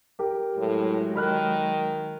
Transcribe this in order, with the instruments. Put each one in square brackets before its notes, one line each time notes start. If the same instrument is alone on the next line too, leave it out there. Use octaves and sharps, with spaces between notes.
[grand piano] G4 A#4
[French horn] A2 [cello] F#3 G#3
[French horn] D#3 [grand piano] B5 F6 F#6